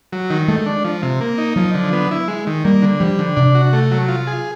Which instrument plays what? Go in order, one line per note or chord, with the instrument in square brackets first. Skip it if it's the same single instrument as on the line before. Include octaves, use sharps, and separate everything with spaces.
[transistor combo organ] F#3
D#3
[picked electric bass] G#3 [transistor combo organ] A3
[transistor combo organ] D4
F3
C3
A#3
D#4
[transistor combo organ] F3 [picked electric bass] F#3
[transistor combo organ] D3
B3
E4
G#3
D#3
[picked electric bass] G3 [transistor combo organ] A#3
[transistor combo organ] D3
[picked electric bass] F3 [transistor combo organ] G3
[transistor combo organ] D3
[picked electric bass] C3 [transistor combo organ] D4
[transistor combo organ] F#4
A3
F#3
F4
G#4